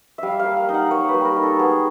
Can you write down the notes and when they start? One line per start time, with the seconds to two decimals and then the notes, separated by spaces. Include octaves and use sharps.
0.18 G3 E5 F5
0.39 F5
0.45 A#3
0.57 F5
0.69 D#4
0.74 F#5
0.91 A#3 C#5
1.09 B4
1.14 G3
1.25 A#4
1.36 D#4
1.43 A4
1.59 B3 G#4